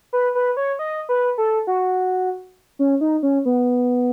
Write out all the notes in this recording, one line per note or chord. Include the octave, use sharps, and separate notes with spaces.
B4
B4
C#5
D#5
B4
A4
F#4
C#4
D#4
C#4
B3